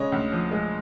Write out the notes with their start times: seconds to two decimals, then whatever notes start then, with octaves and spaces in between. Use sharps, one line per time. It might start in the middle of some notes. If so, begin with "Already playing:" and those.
Already playing: C#3 G#3 C#5 D#5
0.12 D2
0.32 F3
0.51 G#3